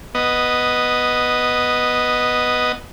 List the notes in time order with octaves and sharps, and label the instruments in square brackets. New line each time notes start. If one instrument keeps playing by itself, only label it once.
[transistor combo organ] B3 D#5